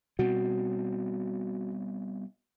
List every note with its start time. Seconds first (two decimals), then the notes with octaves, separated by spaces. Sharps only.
0.19 B2 G3 C4 F#4